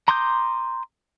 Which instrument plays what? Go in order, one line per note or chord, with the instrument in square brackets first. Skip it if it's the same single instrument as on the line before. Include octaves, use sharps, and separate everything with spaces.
[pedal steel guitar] A#5 C6 D6 D#6 G6